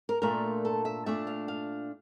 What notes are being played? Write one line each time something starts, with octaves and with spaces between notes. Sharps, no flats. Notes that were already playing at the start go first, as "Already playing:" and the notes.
A#4
A#2 A3 D4 F4 A#4
A4
E5
A#2 A3 D4 F4 E5
F5
F5